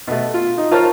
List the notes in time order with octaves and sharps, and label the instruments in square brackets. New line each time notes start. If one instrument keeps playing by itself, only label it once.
[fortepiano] B2 A3
F4
D#4
F4 A#4 C5 C#5 A5 F6